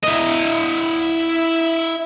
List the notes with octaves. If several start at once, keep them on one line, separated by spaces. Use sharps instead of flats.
E4 D#5